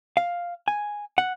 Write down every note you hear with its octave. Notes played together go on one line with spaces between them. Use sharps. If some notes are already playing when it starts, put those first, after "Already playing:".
F5
G#5
F#5